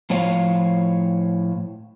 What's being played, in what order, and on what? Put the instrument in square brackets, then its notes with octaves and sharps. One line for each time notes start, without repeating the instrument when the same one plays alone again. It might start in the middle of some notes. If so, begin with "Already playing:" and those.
[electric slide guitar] A2 F3 C5 C#5 F5